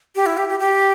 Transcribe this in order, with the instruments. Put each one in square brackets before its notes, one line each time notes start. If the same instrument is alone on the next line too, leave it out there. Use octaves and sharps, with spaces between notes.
[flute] G4
E4
G4
G4
G4